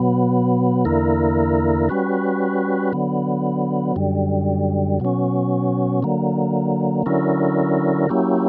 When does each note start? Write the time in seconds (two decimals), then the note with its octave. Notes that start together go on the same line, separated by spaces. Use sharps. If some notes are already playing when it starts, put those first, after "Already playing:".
Already playing: B2 F#3 B3
0.85 E2 D3 A#3 E4 A#4
1.89 G3 C#4 F#4 B4
2.93 D3 F#3 B3
3.96 F#2 D3 G3
5.00 B2 F#3 C#4
6.03 D3 F#3 A#3
7.06 D3 F#3 C#4 E4 A#4
8.09 F#3 A#3 C#4 E4 G4